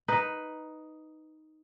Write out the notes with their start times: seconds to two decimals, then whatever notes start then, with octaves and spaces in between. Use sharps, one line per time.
0.08 D#4 B4